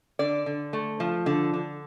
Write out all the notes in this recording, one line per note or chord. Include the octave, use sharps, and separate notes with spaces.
D3 D5
D3
A3
F3
D3
D3